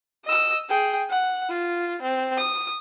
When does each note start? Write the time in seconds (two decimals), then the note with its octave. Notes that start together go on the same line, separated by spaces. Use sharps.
0.25 D#5 E6
0.69 G#4 G5
1.10 F#5
1.49 F4
2.02 C4
2.37 D#6